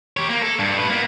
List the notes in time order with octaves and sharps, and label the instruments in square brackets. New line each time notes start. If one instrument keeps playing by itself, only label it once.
[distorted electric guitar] G4 C#5
A#3
A4
G2
A2 B4
A#3 B3